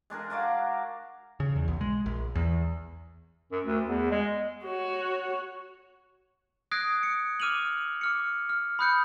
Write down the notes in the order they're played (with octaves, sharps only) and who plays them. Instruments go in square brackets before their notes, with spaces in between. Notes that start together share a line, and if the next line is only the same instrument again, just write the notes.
[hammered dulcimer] G#3 D4 G#4 A#4
F#4 D5 F5 A#5
[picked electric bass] C#3
E2
B1
G#3
A#1
E2
[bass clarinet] F#2
D2
E2
G#3
[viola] F#4 C#5
[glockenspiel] D#6 F#6 G#6 A#6 C7 D7
C#7
D6 F6 D#7 F7 F#7
D6 F6 C#7
F6
B5 D#6 F#6 G6 C#7